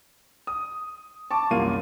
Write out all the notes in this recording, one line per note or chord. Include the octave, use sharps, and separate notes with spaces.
D#6
A5 C#6 D6
C2 F#2 A#3 F4 D#7